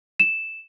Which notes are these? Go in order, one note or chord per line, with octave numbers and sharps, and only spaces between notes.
E7